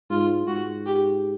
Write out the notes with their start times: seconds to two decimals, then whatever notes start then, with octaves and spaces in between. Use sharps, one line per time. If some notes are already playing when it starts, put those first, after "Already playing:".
0.10 G#2 F4
0.47 G#2 F#4
0.86 G4